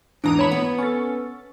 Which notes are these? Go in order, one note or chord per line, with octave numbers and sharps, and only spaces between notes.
E2 G#2 E3 D4 A#5 D#6
C#5 E5 B5
B3
C#4 A4